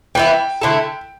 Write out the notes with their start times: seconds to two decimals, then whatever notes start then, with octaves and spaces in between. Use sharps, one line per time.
0.15 E3 B3 E4 G5
0.61 D3 A3 E4 A4